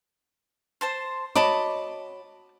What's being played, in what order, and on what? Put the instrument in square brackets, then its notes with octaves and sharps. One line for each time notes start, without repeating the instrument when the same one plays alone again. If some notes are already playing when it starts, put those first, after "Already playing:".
[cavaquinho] C5 A5 C6
[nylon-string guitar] F#4 C#5 D#5 [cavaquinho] A5 B5 D6